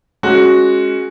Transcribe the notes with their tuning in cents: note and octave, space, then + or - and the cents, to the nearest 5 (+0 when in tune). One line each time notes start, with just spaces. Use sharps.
G#3 +15 C#4 +0 F#4 +0